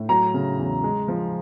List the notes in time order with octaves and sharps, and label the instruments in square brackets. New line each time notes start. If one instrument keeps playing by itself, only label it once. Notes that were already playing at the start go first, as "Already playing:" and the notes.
Already playing: [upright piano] A2
[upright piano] F#3 [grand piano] A#5
[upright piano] C#3
E2
G#3
F3